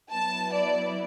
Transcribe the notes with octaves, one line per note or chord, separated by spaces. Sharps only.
F#3 B3 E4 A5
D5